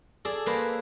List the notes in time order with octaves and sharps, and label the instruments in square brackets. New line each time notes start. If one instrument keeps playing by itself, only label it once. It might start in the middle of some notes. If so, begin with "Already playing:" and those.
[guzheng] G#4 A4 D5
A#3 B4 C5